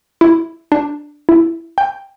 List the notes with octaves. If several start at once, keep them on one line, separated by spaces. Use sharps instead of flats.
E4
D4
E4
G5